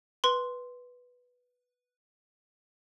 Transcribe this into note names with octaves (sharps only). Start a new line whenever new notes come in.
B4 C6